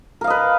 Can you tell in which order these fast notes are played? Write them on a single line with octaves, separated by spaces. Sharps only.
A#4 F5 D#5 B4